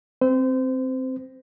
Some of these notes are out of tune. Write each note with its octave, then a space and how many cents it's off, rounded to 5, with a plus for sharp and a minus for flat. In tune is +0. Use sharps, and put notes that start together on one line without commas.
C4 +0 C5 -30